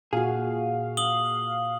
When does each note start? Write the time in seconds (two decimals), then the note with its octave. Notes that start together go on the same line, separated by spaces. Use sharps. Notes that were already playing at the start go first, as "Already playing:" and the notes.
0.13 A#2 F#4 G#4 F5
0.97 D#6 F#7 G7